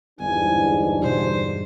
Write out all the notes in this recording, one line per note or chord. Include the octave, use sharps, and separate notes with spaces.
G1 E2 G#2 D4 G#5
G2 B2 G3 C5